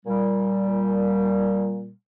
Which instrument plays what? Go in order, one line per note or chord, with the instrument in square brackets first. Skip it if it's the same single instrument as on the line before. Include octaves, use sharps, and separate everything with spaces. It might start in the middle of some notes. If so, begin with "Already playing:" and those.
[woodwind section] A#2 G3